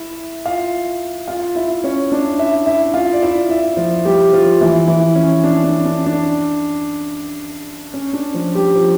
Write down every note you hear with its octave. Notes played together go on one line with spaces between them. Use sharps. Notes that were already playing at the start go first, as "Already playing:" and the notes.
Already playing: E4 E5
F4 F5
F4 F5
E4 E5
C#4 C#5
D4 D5
E4 E5
E4 E5
F4 F5
D5
E4 E5
E4 E5
F3 F4
G3 G4
F3 F4
E3 E4
E3 E4
C#4
D4
D4
D4
D4
C#4
D4
F3 F4
G3 G4
F3 F4